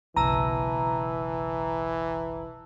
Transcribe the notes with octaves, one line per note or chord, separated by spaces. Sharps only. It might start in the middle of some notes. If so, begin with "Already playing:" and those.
F#1 B1 E3 A5 A#5 E6 D#7